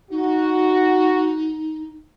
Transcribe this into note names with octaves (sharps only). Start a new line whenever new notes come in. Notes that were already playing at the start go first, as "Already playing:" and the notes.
D#4 F#4